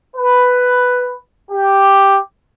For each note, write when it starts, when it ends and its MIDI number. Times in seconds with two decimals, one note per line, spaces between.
0.17 1.14 71
1.52 2.17 67